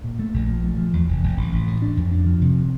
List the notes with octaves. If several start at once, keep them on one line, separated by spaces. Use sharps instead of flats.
A#2
A3
A#1
F3
A3
F3
E2
F1
F1
A1
A1
A2
D4
F2
D4
F3
C3